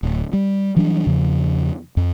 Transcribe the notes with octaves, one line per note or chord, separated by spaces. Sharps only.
D1
G3
E3 F#3 G3 D4
E2 C#3 F3
F2